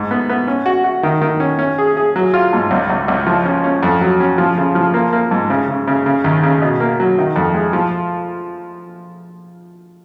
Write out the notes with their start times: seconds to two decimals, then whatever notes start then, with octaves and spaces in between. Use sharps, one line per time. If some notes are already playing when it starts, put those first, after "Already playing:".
Already playing: G#2
0.11 B3
0.29 B3
0.47 C#4
0.66 F#4
0.84 F#4
1.03 D#3
1.21 D#3
1.40 C#4
1.59 C#4
1.78 G#4
1.97 G#4
2.16 F#3
2.34 F4
2.53 G#2
2.71 C#2
2.90 C#2
3.08 C#2
3.27 F3
3.45 C#4
3.64 C#4
3.83 F2
4.01 F#3
4.20 C#4
4.38 F3
4.58 C#3
4.75 F3
4.94 A#3
5.13 A#3
5.31 G#2
5.50 C#3
5.68 C#3
5.87 C#3
6.06 C#3
6.24 D#2
6.43 C#3
6.62 B2
6.80 A#3
7.00 F#3
7.18 D#3
7.36 F2
7.54 G#3
7.73 F3